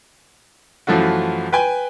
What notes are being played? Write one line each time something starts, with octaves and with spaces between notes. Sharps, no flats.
F#2 E3 F3 A3 F4 F#4
B4 G5 G#5